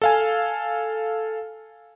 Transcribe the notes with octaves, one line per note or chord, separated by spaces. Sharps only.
A4 F5 G#5